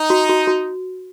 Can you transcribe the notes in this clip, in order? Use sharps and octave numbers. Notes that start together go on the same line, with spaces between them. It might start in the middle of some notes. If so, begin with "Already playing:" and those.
Already playing: D#4
F#4
F#4
F#4